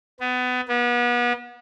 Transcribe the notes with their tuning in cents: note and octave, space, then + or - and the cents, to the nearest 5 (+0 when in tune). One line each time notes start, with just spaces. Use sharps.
B3 +25
B3 -35